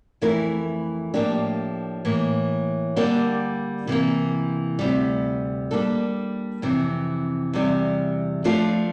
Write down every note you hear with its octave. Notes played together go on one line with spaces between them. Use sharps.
F2 E3 A3 E4 A#4
A2 F3 A#3 D4 G4
A2 E3 A#3
D3 G3 A#3 D4 G4
C3 E3 A#3
D2 C3 G3
G3 A#3 D4 A4
F2 C3 E3
E2 C3 G3
F3 A3 D4 F4 C5